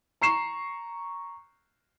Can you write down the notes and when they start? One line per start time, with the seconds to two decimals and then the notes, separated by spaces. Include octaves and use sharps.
0.22 A#5 C#6 C7 E7